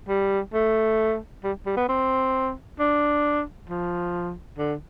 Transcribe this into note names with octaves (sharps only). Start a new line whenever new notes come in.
G3
A3
G3
G3
B3
C4
D4
F3
D3